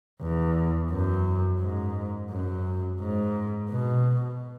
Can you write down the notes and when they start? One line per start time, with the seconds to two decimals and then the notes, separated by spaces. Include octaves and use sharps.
0.22 E2
0.91 F#2
1.61 G#2
2.30 F#2
3.00 G#2
3.70 B2